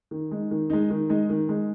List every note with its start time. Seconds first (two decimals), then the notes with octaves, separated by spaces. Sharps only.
0.11 D#3
0.31 G#3 D#4
0.51 D#3
0.70 G#3 D#4
0.90 D#3
1.09 G#3 D#4
1.30 D#3
1.48 G#3 D#4